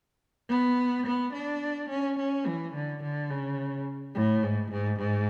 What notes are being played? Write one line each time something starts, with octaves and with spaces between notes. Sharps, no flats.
B3
B3
D4
C#4
C#4
E3
D3
D3
C#3
A2
G#2
G#2
G#2